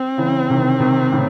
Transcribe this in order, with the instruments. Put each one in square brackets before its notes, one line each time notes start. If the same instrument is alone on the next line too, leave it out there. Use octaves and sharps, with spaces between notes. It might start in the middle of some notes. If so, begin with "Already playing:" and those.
Already playing: [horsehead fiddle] C4
[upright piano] C#3 E3
C3 D#3
C3 D#3
A2 C#3